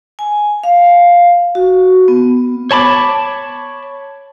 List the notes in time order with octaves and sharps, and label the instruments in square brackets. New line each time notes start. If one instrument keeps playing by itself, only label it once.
[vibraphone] G#5
F5
F#4
B3
[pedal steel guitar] C#5 A5 B5 D6